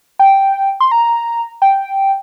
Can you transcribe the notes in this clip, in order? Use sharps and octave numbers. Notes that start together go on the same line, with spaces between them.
G5
C6
A#5
G5